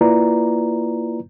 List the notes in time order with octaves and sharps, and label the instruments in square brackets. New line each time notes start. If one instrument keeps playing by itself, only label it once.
[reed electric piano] A#3 E4 F4 B4 D5 A#5